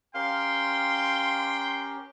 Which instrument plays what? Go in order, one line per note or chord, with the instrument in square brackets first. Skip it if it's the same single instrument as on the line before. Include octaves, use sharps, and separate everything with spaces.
[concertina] C#4 G4 A#4 [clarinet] F5 [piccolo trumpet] G5 [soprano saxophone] C6